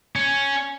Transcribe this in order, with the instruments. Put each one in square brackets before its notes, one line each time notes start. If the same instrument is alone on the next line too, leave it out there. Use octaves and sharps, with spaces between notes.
[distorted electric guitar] C#4